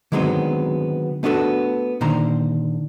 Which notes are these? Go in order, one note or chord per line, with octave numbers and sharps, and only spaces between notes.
D3 D#3 F#3 G#3 B3 C4
A3 B3 D4 F#4 A4
A#2 D3 D#3 C5 A#5